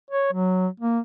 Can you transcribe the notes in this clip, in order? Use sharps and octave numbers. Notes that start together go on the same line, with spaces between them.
C#5
F#3
A#3